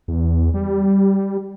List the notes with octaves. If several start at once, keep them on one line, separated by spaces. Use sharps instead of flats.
E2
G3